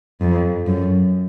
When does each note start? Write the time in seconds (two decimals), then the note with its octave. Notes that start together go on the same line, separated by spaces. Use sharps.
0.21 F2
0.66 F#2